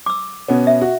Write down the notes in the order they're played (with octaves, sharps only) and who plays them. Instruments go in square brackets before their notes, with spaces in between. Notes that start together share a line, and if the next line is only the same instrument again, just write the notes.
[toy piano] D6 E6
[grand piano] B2 B3 C#4
[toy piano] E5
[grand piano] F#4